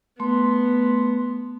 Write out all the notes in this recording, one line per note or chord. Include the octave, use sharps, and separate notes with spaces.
A3 B3 C6